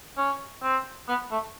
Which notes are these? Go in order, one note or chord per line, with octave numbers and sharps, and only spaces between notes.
C#4
C4
B3
A3